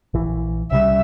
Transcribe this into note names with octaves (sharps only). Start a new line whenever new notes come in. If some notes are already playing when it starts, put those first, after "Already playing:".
A#1 E3
C2 C#3 G3 E5